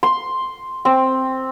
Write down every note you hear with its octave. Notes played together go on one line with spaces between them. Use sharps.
C6
C4